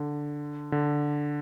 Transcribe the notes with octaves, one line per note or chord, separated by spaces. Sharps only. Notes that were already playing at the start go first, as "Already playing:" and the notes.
Already playing: D3
D3